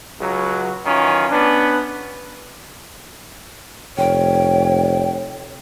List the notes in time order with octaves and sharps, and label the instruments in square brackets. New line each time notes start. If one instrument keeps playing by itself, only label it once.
[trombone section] C#2 F#3
F#2 D#3 E3 C#4 F4
B3 C#4 D4
[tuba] F1 [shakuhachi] C#5 [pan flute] G5